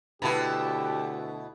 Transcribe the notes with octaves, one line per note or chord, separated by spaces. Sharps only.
D2 B2 E4 G4 B4 A5 B5